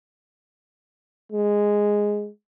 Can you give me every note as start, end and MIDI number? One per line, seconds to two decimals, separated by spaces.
1.32 2.29 56